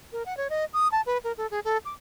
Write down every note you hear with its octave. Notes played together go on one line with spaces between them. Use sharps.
A#4
F#5
C#5
D#5
D#6
A5
B4
A#4
A4
G#4
A4
D6